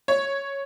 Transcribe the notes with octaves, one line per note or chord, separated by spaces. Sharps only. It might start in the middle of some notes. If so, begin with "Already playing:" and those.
C#5